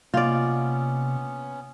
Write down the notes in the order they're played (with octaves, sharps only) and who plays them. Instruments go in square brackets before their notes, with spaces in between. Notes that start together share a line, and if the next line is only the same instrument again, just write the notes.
[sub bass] C3 [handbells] A#3 [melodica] B3 C#4 [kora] F4 D5